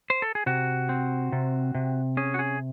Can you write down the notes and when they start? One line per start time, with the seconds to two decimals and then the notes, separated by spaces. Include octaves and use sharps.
0.10 C5
0.22 A4
0.35 G#4
0.46 C3 F#4
0.89 C4
1.32 C3
1.75 C3
2.17 C#4 G#4
2.34 F#4
2.39 G#4